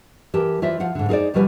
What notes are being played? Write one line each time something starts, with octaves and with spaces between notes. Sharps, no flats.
E3 G4 A#4 A5
E3 F4 C5 D5 E5
F3 F4 F5 F#5
G#2 D3
D#4 G#4 A#4 C5 D5
D#2 B2 F3 G3 B4 G#5